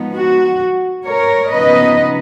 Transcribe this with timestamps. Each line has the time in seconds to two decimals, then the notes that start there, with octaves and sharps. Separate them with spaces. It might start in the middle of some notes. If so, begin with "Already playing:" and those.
Already playing: F3 G#3 B3 D#4
0.14 F#4
1.05 A#4 C#5
1.51 C#3 F3 B3 D#4 B4 D#5